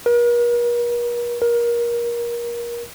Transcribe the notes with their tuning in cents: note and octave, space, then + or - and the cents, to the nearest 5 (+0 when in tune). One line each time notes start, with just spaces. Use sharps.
A#4 +45
A#4 +25